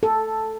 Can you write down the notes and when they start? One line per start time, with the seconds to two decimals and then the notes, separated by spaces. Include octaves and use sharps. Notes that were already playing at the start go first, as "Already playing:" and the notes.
0.03 A4